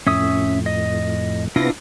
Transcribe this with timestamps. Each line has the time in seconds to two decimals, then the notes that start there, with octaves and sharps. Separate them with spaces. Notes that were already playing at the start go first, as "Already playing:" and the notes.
0.07 F2 A2 C#4 E5 D#6
0.66 D#5
1.56 C3 B3 D4 E4 F4 A#6